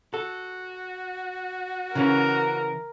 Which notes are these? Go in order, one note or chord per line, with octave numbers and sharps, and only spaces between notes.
F#4 A4
C#3 E3 C#4 A#4